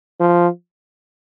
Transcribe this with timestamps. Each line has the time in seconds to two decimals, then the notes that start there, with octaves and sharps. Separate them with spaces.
0.20 F3